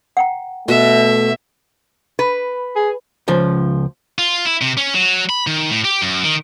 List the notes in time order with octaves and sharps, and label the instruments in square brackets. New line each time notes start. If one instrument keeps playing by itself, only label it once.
[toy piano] F#5 G5 A#5
[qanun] B2 [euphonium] A3 [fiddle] E5
[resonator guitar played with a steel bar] B4
[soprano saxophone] G#4
[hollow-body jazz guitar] C#2 F3
[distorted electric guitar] F4
E4
C3
C#4
F#3
B5
D#3
A2
G4
F#2
D#3